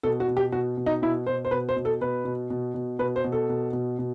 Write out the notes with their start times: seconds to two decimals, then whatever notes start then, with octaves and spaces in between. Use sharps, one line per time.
0.03 B2 A4
0.20 F#4
0.28 B2
0.37 G4
0.52 B2 F#4
0.77 B2
0.86 D#4
1.02 B2 E4
1.26 B2 C5
1.45 C5
1.51 B2 B4
1.69 C5
1.76 B2
1.85 A4
2.01 B2 B4
2.25 B2
2.50 B2
2.74 B2
2.99 B2 B4
3.16 C5
3.24 B2
3.32 A4
3.50 B2
3.73 B2
3.99 B2